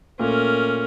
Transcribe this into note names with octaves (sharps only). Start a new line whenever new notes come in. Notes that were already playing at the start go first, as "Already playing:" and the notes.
A#2 A3 C#4 A#4